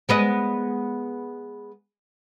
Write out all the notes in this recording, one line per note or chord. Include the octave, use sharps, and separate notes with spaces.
G#3 B3 D#5